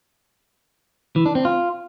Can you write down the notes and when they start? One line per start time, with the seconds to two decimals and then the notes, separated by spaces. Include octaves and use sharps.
1.16 E3
1.26 D4
1.35 C4
1.45 F4